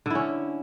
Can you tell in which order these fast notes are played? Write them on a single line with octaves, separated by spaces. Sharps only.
D3 E4 C#4